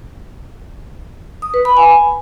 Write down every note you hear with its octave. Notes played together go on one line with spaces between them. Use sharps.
D#6
B4
B5
G#5